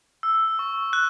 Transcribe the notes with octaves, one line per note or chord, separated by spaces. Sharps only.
E6
C#6
F#6